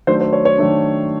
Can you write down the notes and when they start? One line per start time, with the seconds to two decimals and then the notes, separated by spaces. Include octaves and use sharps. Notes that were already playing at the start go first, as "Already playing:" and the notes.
0.07 D#3 F#3 A3 D4 C5
0.21 C5
0.33 C#5
0.45 C#5
0.58 D#3 F#3 A3 D4